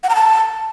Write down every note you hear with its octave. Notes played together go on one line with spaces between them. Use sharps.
F#5
A#5
A5